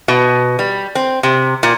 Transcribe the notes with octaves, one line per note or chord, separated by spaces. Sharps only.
B2
G3
C4
C3
A#2